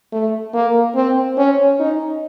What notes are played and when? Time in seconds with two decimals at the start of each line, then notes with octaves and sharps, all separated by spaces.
0.13 A3
0.54 A#3
0.96 C4
1.38 C#4
1.80 D#4